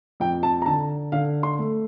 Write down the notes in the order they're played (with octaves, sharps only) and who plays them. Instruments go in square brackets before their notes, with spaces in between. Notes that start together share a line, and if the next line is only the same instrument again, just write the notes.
[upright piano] F2 G5
A5
A#5
D3 A5
D3 F5
C6
A3